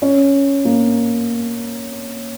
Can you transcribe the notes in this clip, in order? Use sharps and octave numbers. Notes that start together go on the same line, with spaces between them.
C#4
A#3